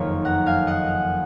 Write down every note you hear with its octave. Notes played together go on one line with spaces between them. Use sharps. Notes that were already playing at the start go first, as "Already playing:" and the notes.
Already playing: F#1 F2 D#3 A#3 C#5
F#5 A#5
F5 G#5
D#5 F#5